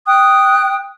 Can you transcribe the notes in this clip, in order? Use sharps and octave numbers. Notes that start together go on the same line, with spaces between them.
G5 D#6 F#6